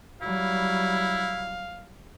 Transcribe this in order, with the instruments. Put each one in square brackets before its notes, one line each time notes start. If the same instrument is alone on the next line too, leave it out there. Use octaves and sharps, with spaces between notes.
[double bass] F#3 G3 [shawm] E4 [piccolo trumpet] F5